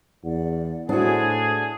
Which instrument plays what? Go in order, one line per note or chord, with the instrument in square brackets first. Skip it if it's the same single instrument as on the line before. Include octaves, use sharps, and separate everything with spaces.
[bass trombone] E2 [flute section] D5 F#5
[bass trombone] A2 [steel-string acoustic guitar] D4 F#4 [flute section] E4 C5 F#5 [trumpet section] G#4